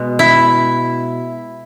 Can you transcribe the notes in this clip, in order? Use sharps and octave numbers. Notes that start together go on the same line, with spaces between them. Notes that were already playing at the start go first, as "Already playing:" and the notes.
Already playing: B2 G#3
E4